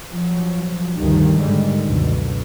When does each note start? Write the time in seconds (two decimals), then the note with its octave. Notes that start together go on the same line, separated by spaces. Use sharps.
0.10 F3 F#3
0.97 D2 G2 D#3 F3 G3
1.41 G#2 D3 D#3 G3 G#3
1.84 C#2 F#2 B2 D3